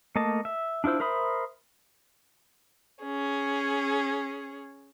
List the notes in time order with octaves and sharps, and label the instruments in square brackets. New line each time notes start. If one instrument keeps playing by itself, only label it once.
[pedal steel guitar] A3 A#3 D#5 A5
E5
D4 E4 F4 C5 E6
A#4 C5 E5 B5 D#6
[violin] C#4 G#4